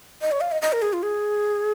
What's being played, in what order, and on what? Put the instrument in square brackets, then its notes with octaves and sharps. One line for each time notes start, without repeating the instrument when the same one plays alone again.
[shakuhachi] D#5
C#5
F5
D#5
D#5
A#4
G#4
F4
G#4